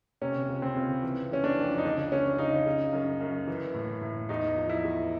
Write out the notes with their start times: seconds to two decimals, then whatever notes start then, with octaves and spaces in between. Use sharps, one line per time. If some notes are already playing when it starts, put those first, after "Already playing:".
0.21 C3 C#4
0.49 C#2
0.62 C4
0.76 C#2
1.03 E3
1.31 E3 C#4
1.44 D4
1.58 F2
1.78 D#4
1.85 C#2 D4
2.12 C#2 C#4
2.38 C#3 D#4
2.66 C#3
2.93 F#2
3.20 F#2
3.47 E3
3.74 A2
4.02 A2
4.29 E2 D#4
4.57 F3
4.69 E4
4.84 E2